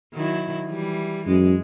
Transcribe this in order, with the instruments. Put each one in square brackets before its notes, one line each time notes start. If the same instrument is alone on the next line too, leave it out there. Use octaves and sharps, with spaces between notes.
[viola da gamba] D#3 F#3 E4
E3 G3
[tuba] F#2 [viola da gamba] G#3